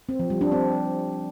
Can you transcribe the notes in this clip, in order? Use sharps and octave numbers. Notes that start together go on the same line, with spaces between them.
C4
F3
G3
D4
C4